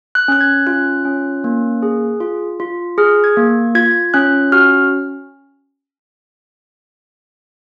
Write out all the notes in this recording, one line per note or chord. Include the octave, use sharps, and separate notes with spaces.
F#6
C#4 F#6
G#6
F4 F#6
C#4
A#3
G#4
F4
F4
G#4 F6
G#6
A#3
F4 G#6
C#4 F#6
F#4 F6